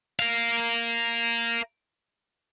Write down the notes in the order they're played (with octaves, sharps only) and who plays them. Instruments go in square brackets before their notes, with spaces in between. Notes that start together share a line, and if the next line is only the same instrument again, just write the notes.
[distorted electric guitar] A#4 F5